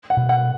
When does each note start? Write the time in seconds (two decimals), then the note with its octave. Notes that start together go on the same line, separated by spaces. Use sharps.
0.10 F#5
0.17 B2
0.29 F#5